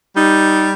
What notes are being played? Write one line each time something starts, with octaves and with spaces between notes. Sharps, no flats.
G3 D#4